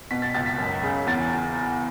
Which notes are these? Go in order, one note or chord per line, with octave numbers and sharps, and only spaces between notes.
B2 B6
A6
C#2 A6
B6
F#2
C#3
E2 A6